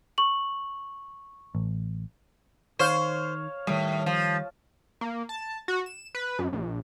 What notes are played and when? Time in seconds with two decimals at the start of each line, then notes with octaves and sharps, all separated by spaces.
0.18 C#6 F#7
1.55 A1
2.79 D#3 C5 C#5 F5
3.67 A2 D#3 G3
4.06 F3
5.01 A#3
5.29 A5
5.68 F#4
5.86 E7
6.15 B4
6.39 F#2
6.53 A#1